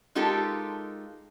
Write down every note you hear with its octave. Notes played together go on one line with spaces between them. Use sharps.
G#3 D#4 F4 G4 A4 A#4